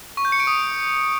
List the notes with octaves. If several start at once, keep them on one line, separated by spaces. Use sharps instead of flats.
C#6
G6
C#7
D7
D#6